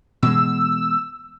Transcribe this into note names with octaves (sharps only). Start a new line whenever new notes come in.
B2 E3 G#3 E6